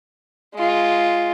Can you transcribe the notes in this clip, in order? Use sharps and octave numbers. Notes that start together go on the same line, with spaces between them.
G#3 F4